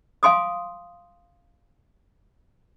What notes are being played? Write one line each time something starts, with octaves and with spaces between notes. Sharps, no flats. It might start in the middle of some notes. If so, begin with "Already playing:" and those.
F5 G#5 C6 D6 D#6